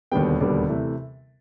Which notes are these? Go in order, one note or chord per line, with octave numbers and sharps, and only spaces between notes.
E1 D#2 D3 G3 B3 G5
E1 D#2 D3 G3 B3 D5
C3 E3 A3